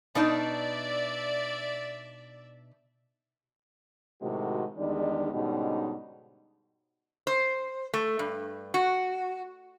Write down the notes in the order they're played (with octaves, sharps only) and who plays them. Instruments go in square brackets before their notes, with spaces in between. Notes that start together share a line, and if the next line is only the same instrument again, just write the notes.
[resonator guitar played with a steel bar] B2 D4 D#4 [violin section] D5 E5
[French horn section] A2 C3 D#3 G#3 F#4
E2 D#3 G3 G#3 D4 D#4
G#2 B2 D3 G3 C#4 D#4
[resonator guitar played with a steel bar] C5
A3
G2
F#4